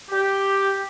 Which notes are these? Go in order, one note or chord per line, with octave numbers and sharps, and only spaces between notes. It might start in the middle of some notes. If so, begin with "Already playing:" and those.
G4